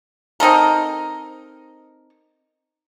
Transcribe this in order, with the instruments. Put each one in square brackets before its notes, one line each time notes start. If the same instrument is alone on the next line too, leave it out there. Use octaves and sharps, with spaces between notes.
[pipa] C4 D#4 A4 A#4